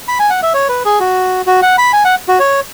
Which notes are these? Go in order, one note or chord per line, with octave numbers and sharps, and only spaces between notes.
B5
G#5
F#5
E5
C#5
B4
G#4
F#4
F#4
F#5
B5
G#5
F#5
F#4
C#5